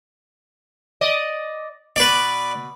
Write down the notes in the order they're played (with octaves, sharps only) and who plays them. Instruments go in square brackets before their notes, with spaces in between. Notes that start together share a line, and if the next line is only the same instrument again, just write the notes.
[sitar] D5 D#5
[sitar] B2 [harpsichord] B4 D5